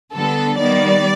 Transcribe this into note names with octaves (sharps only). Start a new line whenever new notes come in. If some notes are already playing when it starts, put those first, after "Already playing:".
D3 G3 B3 A4
D#3 G3 B3 D5